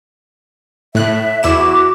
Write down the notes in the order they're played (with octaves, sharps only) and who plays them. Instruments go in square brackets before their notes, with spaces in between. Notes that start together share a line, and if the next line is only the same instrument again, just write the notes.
[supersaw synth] A2 F#6 [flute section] E5
[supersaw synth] E2 E4 E7 [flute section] F#4 D6